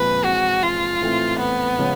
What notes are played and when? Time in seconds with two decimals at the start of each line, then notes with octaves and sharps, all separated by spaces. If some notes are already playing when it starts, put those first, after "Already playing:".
Already playing: A#2 F3 G#3 C4 B4
0.24 E3 G#3 C4 F#4
0.63 F4
1.00 A2 E3 A3 C4
1.39 B3
1.78 C#3 F3 G#3 C#4